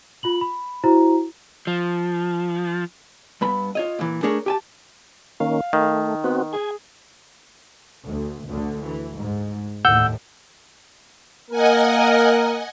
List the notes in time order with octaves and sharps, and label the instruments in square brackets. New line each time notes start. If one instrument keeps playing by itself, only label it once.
[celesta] F4 B5 F#7
B5
E4 F#4 C5 A#5
[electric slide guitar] F3
[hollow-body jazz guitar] G2 B3 B5
F4 C#5 D#5
A#2 E3
A3 D4 G#4 A#4 C#5
G4 G#5 A5
[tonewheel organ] D#3 A#3 C#4 [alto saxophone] F5
[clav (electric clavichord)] D#3 [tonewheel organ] A3
[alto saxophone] B3 [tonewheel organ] C4 F#4
[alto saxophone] G#4 [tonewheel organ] G#5
[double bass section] D2
D2 D3
E3
G#2
[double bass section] D#2 A2 [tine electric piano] F#5 E6 G6
[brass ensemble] A#3 A#4 [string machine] D#5 F#5 G#5